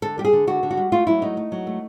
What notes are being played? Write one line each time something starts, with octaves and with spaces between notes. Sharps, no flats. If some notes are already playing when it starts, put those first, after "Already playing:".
D3 A4
G3 G4
G#4
D3
D3 F#4
D3
F#4
G3
A3 F4
F#3 E4
A3 D#4
A3
F#3
A3